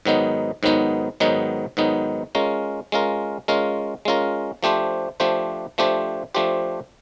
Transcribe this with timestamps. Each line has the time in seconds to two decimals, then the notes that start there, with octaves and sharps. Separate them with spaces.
0.05 G#2 D#3 F#3 B3 D#4
0.63 G#2 D#3 F#3 B3 D#4
1.20 G#2 D#3 F#3 B3 D#4
1.77 G#2 D#3 F#3 B3 D#4
2.35 G#3 C#4 F4 A#4
2.92 G#3 C#4 F4 A#4
3.48 G#3 C#4 F4 A#4
4.05 G#3 C#4 F4 A#4
4.63 F3 A3 D4 G4 C5
5.20 F3 A3 D4 G4 C5
5.78 F3 A3 D4 G4 C5
6.35 F3 A3 D4 G4 C5